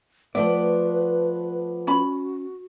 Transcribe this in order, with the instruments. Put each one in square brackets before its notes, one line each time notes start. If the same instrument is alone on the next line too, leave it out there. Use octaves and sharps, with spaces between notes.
[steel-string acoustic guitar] F3 A3 B3 [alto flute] B4 [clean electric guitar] D5 [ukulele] E5
[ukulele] C#4 B5 [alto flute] F#4